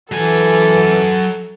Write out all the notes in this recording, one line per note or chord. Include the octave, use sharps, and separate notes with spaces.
E3 F#3 A4 G#5